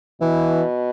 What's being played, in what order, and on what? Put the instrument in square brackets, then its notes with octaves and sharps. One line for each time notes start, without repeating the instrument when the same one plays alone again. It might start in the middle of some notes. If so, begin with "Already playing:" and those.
[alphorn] B2 [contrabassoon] E3